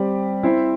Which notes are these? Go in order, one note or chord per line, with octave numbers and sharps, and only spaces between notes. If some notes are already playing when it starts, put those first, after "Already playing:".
Already playing: G3 C4 G4 D5
C4 E4 C5 E5